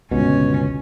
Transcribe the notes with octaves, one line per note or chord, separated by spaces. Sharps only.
G1 C#2 B2 C#4